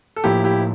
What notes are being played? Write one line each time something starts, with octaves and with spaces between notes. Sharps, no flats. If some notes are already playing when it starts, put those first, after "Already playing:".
A4
A2 F3 A#3 E4 G4
E4 G4